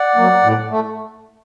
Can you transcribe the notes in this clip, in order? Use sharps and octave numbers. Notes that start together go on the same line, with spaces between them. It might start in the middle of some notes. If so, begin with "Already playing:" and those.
Already playing: D5 F#5
F#3 A#3
A2
A3